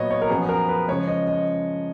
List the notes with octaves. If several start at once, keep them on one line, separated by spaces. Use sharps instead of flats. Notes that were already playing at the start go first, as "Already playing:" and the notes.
Already playing: A#2 F#3 B3 C#5 D#5
C#5
A#4
F#2 F3 B3 G#4
A#4
B4
C#3 F3 G#3 C#5
D#5
D#5